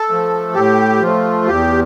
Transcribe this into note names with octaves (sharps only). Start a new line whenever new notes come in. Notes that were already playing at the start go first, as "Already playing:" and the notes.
Already playing: A4
F3 A3
A2 G4
F3 A3 F4
E2 G4